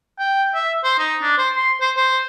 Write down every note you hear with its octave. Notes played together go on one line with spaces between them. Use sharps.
G5
E5
C5
D#4
D4
C5
C6
C5
C5